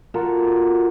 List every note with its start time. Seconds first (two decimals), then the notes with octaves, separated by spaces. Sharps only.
0.14 F4 F#4 A4 A#4